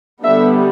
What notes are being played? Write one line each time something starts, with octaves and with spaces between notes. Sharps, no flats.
D3 G3 B3 D4 E5